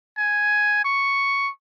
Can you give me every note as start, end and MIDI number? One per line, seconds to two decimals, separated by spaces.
0.18 0.80 80
0.85 1.50 85